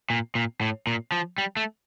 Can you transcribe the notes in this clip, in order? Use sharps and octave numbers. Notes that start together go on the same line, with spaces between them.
A#2
A#2
A2
A#2
F3
G3
A3